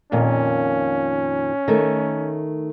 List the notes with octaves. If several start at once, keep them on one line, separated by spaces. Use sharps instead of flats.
F2 A#2 D#3 C#4
D#3 A3